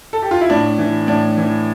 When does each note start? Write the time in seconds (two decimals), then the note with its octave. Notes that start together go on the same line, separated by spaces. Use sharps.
0.13 A4
0.22 G4
0.31 F4
0.41 E4
0.50 A2 D4
0.78 E3
1.08 A2 D4
1.38 E3